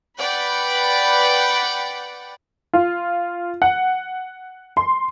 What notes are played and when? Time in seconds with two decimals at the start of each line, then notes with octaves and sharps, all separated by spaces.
0.18 B4 D5 F#5 G5 B5
2.73 F4
3.62 F#5
4.77 C6